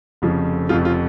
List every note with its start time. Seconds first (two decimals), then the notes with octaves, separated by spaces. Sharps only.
0.22 F1 F2 C#3 F3
0.69 F1 F2 C#3 F3 F4
0.85 F4